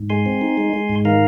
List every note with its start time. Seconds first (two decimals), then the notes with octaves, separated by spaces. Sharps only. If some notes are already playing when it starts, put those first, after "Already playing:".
Already playing: G#2
0.10 G#3 G#5 C6
0.26 C4
0.41 D#4
0.58 G#3
0.73 G#3
0.89 G#2
1.05 D#3 F5 A#5